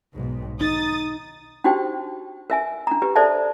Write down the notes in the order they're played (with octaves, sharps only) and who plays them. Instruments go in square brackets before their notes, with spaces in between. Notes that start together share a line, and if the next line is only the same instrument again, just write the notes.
[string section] B1 G#2
[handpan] D#4 [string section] D#6 A6
[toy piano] D4 D#4 F#4 G4 C5 G5
A#4 E5 G#5
D4 A#5
G4 B4
G#4 A4 C5 D5 E5 A5